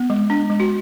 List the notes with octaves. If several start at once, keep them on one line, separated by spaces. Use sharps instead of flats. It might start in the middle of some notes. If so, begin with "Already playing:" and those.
Already playing: B3
G#3
D4
G#3
F#4